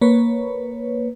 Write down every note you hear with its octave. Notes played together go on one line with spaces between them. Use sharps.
A#3 B4 C#5